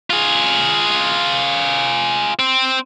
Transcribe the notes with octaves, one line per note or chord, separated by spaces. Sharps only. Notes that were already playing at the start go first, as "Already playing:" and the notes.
F4 G#4
C4